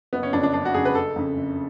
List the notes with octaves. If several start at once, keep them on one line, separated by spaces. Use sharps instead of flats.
F#1 B3
C#4
F2 C#3 D4
D4
F#1 D4
F#4
F2 C#3 G#4
B4
F#1 A4
F2 C#3
F#1